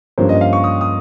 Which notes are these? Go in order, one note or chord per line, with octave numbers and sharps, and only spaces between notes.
G2 F3 A#3 C#4 C5
D#5
F5
C#6
D#6
D#6